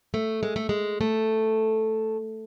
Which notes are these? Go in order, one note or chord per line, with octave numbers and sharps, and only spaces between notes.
A3
G#3
A3
G#3
A3